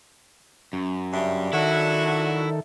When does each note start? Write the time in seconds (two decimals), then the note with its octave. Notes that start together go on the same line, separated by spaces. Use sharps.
0.73 F#2 C#4
1.13 G2 C#3 G3 D5 E5
1.53 D#3 F#3 D4 E4 F#4 A4